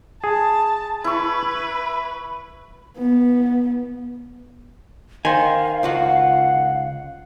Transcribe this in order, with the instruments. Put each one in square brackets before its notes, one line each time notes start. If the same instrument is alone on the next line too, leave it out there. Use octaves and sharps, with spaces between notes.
[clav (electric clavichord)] G#4 [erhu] A5
[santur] E4 C#6 [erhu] B4
[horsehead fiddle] B3
[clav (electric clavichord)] D#3 C5 [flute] F5 [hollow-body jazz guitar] G#5
[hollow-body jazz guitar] C#2 F4 F#4 [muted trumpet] F#5